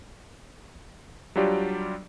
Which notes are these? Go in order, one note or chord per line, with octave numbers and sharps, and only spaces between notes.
F#3 G3 D4 F4 G4 D5